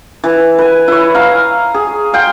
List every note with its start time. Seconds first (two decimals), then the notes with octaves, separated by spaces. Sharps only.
0.24 E3
0.59 B4 G#5
0.88 E4 C#5
1.15 F5 A#5
1.74 G#4
2.13 F5 G5 C6